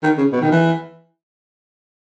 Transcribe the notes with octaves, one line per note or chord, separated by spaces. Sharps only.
D#3
C#3
B2
D#3
E3